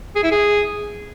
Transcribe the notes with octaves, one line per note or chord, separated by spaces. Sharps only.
G#4
E4
G#4